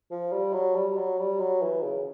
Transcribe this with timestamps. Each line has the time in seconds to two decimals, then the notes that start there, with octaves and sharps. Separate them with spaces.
0.11 F3
0.32 G3
0.53 F#3
0.75 G3
0.97 F#3
1.19 G3
1.40 F#3
1.62 E3
1.83 C#3